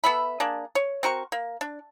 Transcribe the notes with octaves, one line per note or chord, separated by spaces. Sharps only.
B3 A4 E5 B5
A#3 D4 G#4
C#5
C4 F#4 A#4 C#6
A#3
D4